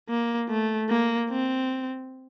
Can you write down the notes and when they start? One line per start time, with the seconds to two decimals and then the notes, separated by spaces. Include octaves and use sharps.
0.09 A#3
0.49 A3
0.89 A#3
1.30 C4